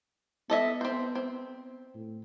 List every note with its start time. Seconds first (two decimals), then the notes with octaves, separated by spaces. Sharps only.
0.50 B3 A4 D#5 E5
0.81 C4 C5
1.15 C4
1.94 A2